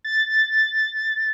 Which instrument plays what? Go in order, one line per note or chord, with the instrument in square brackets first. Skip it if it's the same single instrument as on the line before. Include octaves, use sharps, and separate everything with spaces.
[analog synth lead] A6